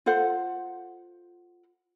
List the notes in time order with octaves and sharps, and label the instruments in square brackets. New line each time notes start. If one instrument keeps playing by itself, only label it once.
[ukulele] F4 A4 C5 F#5